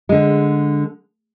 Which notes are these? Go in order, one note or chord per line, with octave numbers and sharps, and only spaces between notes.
D3 G#3